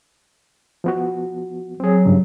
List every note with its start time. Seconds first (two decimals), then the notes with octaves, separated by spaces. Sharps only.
0.84 F3 B3 F#4
1.80 F#3 C4 G#4
2.05 G2 C#3